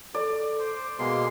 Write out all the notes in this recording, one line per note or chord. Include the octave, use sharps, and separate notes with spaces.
A4 D5
C5
B2 G#3 A#3 C6